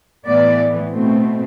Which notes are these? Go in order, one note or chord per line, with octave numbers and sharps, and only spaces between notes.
A2 E3 B3 D5
B2 A3 C4